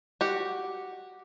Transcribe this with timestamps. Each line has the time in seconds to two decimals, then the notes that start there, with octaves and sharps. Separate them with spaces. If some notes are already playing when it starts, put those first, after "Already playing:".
0.21 F#4 G4